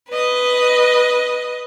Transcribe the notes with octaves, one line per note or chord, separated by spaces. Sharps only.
B4 D#5